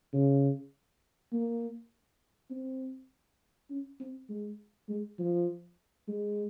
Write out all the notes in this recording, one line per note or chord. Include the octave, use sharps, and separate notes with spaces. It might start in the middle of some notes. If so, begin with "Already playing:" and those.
C#3
A#3
C4
C#4
C4
G#3
G#3
F3
G#3